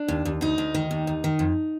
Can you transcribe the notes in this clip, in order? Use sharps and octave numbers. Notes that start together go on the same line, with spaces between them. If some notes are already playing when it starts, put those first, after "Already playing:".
Already playing: D4
D#2
D#2
D2 D#4
D2
D#3
D#2
D#2
D#3
F2